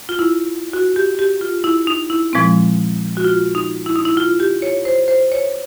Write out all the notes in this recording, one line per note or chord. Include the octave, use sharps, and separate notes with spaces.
F4
E4
F#4
G4
G4
F4
E4
D#4
E4
A#2 F3 G#3 C4
F#4
F4
D#4
E4
D#4
E4
F4
G4
C#5
C5
C5
C#5